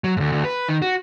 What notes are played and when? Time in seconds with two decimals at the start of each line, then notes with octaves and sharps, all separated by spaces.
0.04 F#3
0.17 D2 G#2
0.32 D2
0.45 B4
0.69 D#3
0.82 F#4